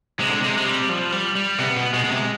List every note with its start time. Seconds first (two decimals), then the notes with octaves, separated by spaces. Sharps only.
0.20 C3 G#3
0.30 D3
0.41 C3 G#3
0.57 G#3
0.66 G3
0.89 F3
1.12 G3
1.35 G3
1.58 C3 B3
1.77 B2
1.93 B2 G#3
2.04 B2
2.12 C3